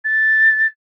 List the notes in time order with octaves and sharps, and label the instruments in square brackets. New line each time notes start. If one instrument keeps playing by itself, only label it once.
[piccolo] A6